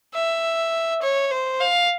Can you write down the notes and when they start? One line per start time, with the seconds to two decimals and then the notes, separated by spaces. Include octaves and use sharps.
0.14 E5
1.03 C#5
1.31 C5
1.60 F5